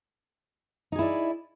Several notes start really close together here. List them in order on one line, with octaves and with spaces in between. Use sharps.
D#4 G#4 E4 D5